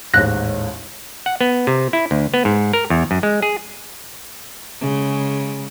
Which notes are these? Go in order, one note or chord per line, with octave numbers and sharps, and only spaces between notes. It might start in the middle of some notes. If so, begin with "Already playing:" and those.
A1 D#2 G#2 F#6 A#6
F#5
B3
C3
E4
D2
B3
G#2
A#4
E2
F#2
G#3
G#4
C#3 G#3